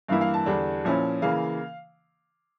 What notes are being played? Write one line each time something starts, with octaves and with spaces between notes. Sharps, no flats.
G2 E3 A#3 E4 F5
F5
A5
E2 D3 G3 D4
A#2 F3 C#4 E4
C#3 E3 A#3 F5